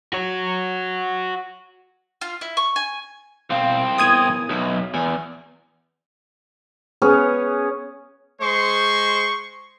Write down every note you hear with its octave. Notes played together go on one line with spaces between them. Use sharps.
F#4 C#5
F4
E4
C#6
G#5
C2 B2 C4 F5
B3 E4 A#4 D#6 G#6 D#7
B1 F#4 E5
E2 G#5
B3 C#4 G#4 C#5
G#3 C5 C6 C#6